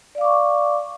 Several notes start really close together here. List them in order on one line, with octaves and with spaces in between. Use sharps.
D5 F5 D6 C#6